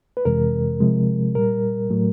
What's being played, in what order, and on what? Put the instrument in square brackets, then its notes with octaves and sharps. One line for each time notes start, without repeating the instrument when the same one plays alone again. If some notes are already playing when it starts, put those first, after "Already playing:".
[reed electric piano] B4
F2 C3 E3 G#3 A#4
C3 F3 G#3
A#2 G3 A#4
A2 F#3 A3